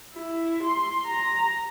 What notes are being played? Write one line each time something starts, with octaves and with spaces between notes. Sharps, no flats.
E4
C6
A#5